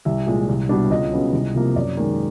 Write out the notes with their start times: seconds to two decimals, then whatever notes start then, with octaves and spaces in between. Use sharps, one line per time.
0.05 C2 E5
0.27 A#2 F3 G#3
0.49 C2
0.69 B2 G3 B3 D4
0.90 C#2 D#5
1.12 C#3 F#3 B3
1.33 C2
1.55 C3 F3 A#3
1.75 F#2 D5
1.97 D#3 G#3